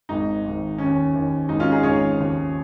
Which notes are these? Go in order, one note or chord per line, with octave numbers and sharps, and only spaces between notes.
G#1 G#2 D#3 D#4
G#1 G#2 D#3
D#2 D#3 C#4
D#2 D#3
G#1 G#2 D#3 D#4
C#4 F4
D#4 G#4
G#1 G#2 D#3 G#4 C#5
D#2 C#3 F3